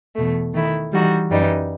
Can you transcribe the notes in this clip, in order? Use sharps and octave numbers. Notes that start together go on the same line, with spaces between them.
E2 B2 A3
D#3 A3 E4
E3 G3 D#4 F#4
F#2 E3 G3 D#4